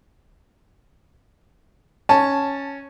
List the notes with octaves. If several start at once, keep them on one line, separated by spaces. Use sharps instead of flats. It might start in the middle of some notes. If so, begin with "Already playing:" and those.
C#4 A5